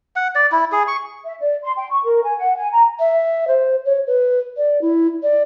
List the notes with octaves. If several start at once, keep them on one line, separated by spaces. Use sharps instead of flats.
F#5
D5
E4
G#4
C#6
E5
D5
C6
G5
C#6
A#4
G#5
F#5
G#5
A#5
E5
C5
C#5
B4
D5
E4
D5